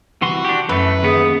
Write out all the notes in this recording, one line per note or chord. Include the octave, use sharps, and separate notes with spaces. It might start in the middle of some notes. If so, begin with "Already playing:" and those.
C2 E3 F#4 C6
D4 G4
F#2 E3 A3 B4
D#2 B3 G#4